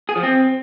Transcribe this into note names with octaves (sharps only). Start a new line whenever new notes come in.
G#4
F3
C4